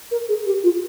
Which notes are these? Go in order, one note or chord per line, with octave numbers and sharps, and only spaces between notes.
A#4
G#4
G4
F4